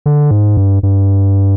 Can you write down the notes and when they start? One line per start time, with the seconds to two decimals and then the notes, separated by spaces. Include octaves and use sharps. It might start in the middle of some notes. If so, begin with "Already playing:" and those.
0.06 D3
0.31 G#2
0.57 G2
0.83 G2